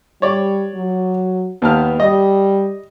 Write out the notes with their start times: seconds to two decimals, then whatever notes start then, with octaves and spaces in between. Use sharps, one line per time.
0.22 G3 C#5 D5
0.75 F#3
1.62 D#2 B3 A5 F6
2.00 G3 D#5